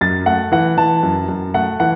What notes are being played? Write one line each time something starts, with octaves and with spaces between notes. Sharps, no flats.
F#2 A6
A3 F#5
E3 F#5
E3 A5
F#2
F#2
A3 F#5
E3 F#5